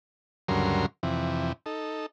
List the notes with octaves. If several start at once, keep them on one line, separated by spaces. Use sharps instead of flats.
D2 G2 C#3 F#3 A#4 C6
F2 C3 E3
D#4 A4